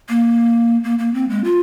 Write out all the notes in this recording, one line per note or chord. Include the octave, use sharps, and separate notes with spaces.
A#3
A#3
A#3
C4
G#3
F4